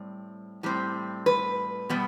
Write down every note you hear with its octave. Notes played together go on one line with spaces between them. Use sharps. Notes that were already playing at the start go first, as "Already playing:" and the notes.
Already playing: A2 G3 C4
A2 G3 C4
B4
B2 G3 B3